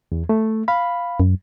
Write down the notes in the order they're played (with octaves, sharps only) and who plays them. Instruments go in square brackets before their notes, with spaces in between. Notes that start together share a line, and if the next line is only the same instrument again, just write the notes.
[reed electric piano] E2
A3
F5 B5
[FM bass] F#2